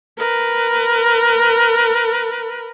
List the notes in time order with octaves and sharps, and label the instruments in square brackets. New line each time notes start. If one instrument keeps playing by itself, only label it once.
[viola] A#4 B4